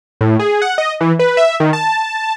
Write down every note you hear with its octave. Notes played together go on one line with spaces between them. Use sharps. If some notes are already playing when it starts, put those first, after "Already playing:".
A2
G#4
F#5
D#5
E3
B4
E5
D#3
A5